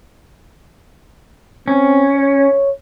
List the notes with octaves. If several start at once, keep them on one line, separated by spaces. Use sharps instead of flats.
C4 C#4
C#5